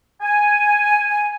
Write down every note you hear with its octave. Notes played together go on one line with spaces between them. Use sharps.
G#5